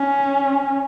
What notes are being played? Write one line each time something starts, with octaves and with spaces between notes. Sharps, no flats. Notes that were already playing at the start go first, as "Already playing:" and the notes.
Already playing: C#4